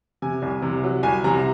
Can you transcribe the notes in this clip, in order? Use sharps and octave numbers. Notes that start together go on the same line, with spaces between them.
C3 G#5
C2
C3
F#3
C2 G#5
C3 A#5